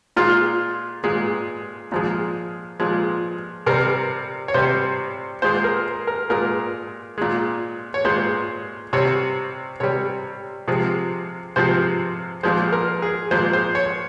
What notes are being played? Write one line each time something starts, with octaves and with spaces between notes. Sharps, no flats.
A#2 G#3 F4
A#2 G#3
A#2 F3 G#3
A#2 F3 G#3
C3 G3 A#4
C#5
C3 G3 C5
A#2 G#3 C5
A#4
A#4
A#2 G#3 A#4
A#2 G#3
C#5
A#2 G#3 C5
C3 G3 C#5
C3 G3 C#5
C3 F3 G#3
C3 F3 G#3 C5
A#2 F3 G#3 C5
A#4
G#4
A#2 F3 G#3 C5
C5
C#5